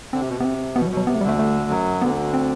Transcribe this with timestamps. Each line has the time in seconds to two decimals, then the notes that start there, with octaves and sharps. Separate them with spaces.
0.13 D3 C4
0.21 C3
0.29 B2
0.37 C3 B3
0.45 C4
0.76 B2 B3
0.82 E3
0.87 F#3
0.92 B2
0.97 F#3
1.07 C3 B3
1.15 A3
1.21 D2 D3 G3
1.29 A3
1.39 A3
1.70 F#2 F#3
2.02 D2 D3 B3
2.34 C4